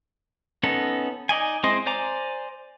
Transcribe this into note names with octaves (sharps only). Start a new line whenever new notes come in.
B3 C#4 D#4 A4
D#4 D5 D#5 G#5
G#3 C4 E4 C5 D#5
C5 D5 G#5 A#5 D6